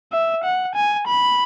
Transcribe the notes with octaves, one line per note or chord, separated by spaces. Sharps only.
E5
F#5
G#5
B5